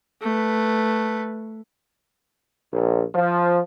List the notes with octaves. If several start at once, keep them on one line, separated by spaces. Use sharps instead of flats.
A3 B4
A#1
F3